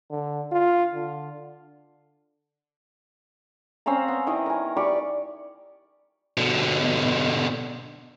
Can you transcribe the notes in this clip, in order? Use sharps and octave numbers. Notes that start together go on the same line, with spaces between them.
D3
F4
D3
C4 C#4 F5 A#5
B3
D#3 E3 D#5
A#4 G#5
G4 D5 B5 C#6
B2 D3